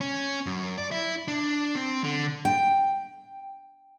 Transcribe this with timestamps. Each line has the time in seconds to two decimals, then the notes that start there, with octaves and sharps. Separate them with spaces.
0.01 C#4
0.46 F#2
0.78 D5
0.91 E4
1.28 D4
1.75 C4
2.04 D3
2.45 G5